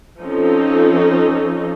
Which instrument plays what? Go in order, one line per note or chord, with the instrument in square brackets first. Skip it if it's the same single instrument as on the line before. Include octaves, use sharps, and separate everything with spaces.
[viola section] F3 C4 C#4 D#4 A4